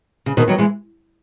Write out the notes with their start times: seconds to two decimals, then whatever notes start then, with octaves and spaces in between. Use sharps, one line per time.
0.26 C#3
0.37 B2 D#3
0.48 D#3 F#3
0.58 E3 G#3